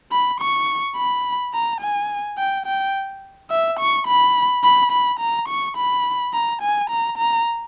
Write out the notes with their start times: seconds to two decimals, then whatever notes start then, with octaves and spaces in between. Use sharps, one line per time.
0.12 B5
0.40 C#6
0.96 B5
1.54 A#5
1.81 G#5
2.38 G5
2.66 G5
3.51 E5
3.80 C#6
4.07 B5
4.64 B5
4.92 B5
5.20 A#5
5.49 C#6
5.77 B5
6.34 A#5
6.62 G#5
6.90 A#5
7.18 A#5